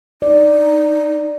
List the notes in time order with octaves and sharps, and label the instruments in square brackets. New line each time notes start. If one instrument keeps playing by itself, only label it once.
[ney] D#4 [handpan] D5